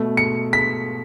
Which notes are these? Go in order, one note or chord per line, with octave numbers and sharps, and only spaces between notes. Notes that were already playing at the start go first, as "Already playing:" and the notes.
Already playing: B2 A3
C#7
B6